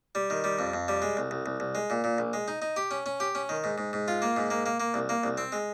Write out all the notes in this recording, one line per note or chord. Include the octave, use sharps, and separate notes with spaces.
G3
D#3
G3
F2
F2
G3
G#3
C2
C2
C2
C2
G#3
A#2
A#2
A#1
G#3
D#4
D#4
G4
C#4
C#4
G4
C#4
D#3
G#2
G#2
G#2
F4
A#3
G#2
A#3
A#3
A#3
C2
A#3
C2
C4
G#3